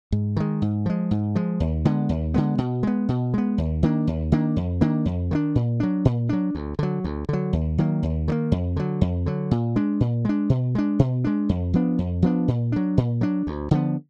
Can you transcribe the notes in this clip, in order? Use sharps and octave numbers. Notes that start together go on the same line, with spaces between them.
G#2
D#3 G#3
G#2
F3 G#3
G#2
F3 G#3
D#2
D3 G#3 B3
D#2
D3 G#3 B3
B2
G#3 B3
B2
G#3 B3
D#2
D#3 A#3 D4
D#2
D#3 A#3 D4
F2
D#3 A#3 D4
F2
D#3 A#3 D4
A#2
F#3 D4
A#2
F#3 D4
D2
D3 F#3
D2
D3 F#3
D#2
D#3 F#3 A#3
D#2
D#3 F#3 A#3
F2
D3 F#3
F2
D3 F#3
A#2
G#3 D4
A#2
G#3 D4
B2
G#3 D4
B2
G#3 D4
F2
F3 B3 D4
F2
F3 B3 D4
A#2
F#3 D4
A#2
F#3 D4
D2
D3 F3 B3